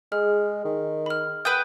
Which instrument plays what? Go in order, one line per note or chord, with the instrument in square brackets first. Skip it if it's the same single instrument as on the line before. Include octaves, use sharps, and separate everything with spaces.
[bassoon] G#3 [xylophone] G#4 F6
[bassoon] D#3
[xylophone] B5 F6
[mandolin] B4 F#5 G5 [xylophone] D#6 G6